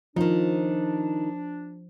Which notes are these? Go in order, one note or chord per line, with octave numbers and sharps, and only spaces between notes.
D#3 F3 D4 D#4